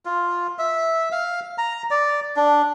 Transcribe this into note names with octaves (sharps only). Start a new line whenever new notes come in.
F4
E5
F5
A#5
D5
D4